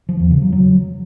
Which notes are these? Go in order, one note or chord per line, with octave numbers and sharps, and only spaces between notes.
F3
E2
C#3
F#3
F#3